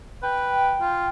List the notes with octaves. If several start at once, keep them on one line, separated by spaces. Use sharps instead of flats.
B4 G5
F4